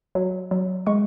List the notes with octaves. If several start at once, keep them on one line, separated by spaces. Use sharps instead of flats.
F#3
F#3
G#3 C#6